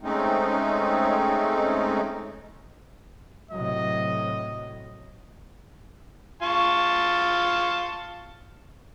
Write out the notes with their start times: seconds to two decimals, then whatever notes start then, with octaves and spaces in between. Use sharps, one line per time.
0.03 G#3 A3 C4 C#4 D#4
3.51 A2 C3 F#3 D#5
6.42 F4 A5 C#6